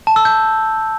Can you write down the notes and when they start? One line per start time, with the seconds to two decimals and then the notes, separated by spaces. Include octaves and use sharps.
0.07 A5
0.16 E6
0.25 G6